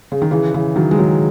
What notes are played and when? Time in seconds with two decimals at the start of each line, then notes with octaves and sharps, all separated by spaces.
0.12 C#3
0.22 D#3
0.31 C#3 E3
0.54 C#3 E3
0.76 D#3 F#3
0.91 G#3
0.99 D#3 F#3